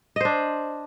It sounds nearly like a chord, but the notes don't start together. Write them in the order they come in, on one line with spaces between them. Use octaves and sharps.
D#5 C5 D4